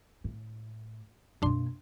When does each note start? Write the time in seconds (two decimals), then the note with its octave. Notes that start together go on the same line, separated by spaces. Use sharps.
0.24 A2
1.42 F#2 B2 A#3 D4 C6